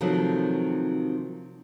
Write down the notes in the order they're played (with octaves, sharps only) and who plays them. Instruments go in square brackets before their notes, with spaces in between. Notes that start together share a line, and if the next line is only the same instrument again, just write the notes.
[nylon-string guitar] C3 D#3 F3 F#3 A3 C4